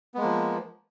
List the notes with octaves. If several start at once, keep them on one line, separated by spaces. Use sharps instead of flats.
F3 G#3 A#3 B3